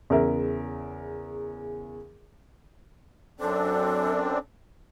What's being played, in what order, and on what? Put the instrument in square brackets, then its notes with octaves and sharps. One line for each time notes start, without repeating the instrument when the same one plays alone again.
[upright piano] E2 C#3 A#4 E5
[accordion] F#2 C4 D4 [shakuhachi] A4